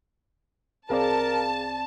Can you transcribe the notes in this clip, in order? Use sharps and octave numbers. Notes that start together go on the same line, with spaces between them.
C2 C4 G#4 A#4 D5 F5 A5